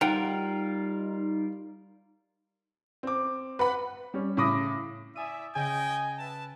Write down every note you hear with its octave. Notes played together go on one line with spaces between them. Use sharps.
G3 D#4 F4 A#4 F#5 G5
C4 D6
B4 F#5 B5
G3 C#4
A2 C#3 B5 D6 D#6 A#6
E4 D5 E5 G#5 D#6 D#7
C#3 D#5 G5 G#5
B4 E5 A5